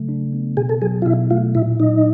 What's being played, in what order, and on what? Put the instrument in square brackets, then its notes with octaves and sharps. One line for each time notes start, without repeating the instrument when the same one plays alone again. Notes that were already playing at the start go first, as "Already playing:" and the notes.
Already playing: [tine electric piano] C#3 F#3 A3
D4
B3
[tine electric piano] B2 [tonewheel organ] G#4
[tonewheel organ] A4
[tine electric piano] F#3 [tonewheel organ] G#4
[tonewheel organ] F4
[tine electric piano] B2 [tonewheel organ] E4
[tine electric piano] A3 [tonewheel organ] F4
[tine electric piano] A#2 [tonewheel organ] E4
[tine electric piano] F#3 [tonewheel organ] D#4